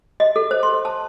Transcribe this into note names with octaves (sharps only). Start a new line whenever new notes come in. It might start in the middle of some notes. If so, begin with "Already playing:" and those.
D#5
A4
C5
C6
A5